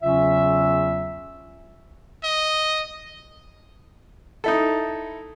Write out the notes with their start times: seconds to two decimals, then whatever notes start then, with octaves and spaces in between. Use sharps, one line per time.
0.03 E2 C#3 F#3 C#4 F4 E5
2.23 D#5
4.44 D#4 E4 A4